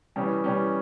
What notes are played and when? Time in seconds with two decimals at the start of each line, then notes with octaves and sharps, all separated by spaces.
0.16 C#3 E3 G3 C#4
0.44 C#3 E3 G3 C#4